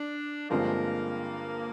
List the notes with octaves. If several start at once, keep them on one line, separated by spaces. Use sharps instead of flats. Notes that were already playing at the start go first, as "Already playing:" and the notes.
Already playing: D4
G2 D3 F3 G#3 A#3 C4